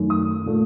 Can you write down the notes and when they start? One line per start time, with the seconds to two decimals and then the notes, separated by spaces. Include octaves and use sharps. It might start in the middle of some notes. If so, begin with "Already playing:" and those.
Already playing: F#2 D#3 A3
0.10 D#6
0.46 A#2 A3